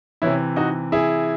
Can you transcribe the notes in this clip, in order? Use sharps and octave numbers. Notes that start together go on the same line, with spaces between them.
C3 E3 C#4 E4
D#4 F#4
E4 G#4